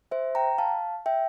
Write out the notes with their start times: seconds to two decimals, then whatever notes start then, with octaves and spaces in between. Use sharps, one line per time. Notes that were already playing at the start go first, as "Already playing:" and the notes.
0.11 C5 E5
0.35 G5 A#5
0.58 F5 A5
1.06 E5 G5